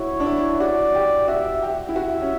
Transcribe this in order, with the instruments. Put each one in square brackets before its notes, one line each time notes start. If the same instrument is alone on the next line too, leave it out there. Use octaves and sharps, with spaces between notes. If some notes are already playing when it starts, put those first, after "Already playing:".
Already playing: [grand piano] E4 F#4 [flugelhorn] C#5
[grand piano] D4
E4
[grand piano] F#4 [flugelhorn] D5
[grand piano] G4
[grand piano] F#4 [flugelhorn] E5
[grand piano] G4
E4
[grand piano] F#4 [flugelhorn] E5
[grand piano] C#4